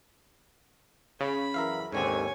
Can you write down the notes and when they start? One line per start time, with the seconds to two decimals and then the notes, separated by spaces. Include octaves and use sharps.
1.21 C#3 B5
1.54 F#2 E3 A#4 E5 F5
1.92 D#2 G#2 D3 C4 C#5 G#5